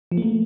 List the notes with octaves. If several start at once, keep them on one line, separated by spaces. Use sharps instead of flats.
F3
A#3
A3